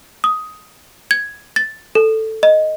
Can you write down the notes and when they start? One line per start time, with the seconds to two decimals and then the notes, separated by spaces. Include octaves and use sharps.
0.24 D#6
1.11 G#6
1.56 A6
1.95 A4
2.43 D#5